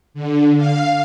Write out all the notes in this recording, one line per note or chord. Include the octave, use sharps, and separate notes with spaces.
D3
F5